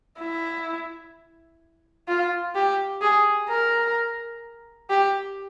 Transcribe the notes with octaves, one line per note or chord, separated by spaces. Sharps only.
E4
F4
G4
G#4
A#4
G4